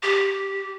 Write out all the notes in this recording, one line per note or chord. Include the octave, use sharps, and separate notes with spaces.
G4